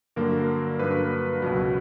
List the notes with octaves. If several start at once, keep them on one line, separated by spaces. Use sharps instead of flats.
G2 D3 F#3 A#3 A#4
G2 D3 F#3 A#3 B4
C#2 B2 F#3